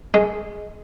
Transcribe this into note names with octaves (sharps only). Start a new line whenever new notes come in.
G#3